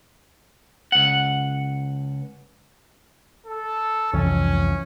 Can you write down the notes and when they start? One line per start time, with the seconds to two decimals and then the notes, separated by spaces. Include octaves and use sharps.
0.92 C#2 F#5
3.46 A4
4.13 C2 F2 E3 C#4